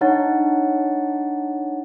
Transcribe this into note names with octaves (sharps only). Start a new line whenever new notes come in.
D4 D#4 C#5 F#5 A6